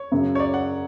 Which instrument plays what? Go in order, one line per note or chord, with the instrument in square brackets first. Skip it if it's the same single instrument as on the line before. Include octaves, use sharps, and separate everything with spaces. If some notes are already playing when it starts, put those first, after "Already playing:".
Already playing: [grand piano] C#5
[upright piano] F#2 C#3 F#3
[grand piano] C#5
D5
F#5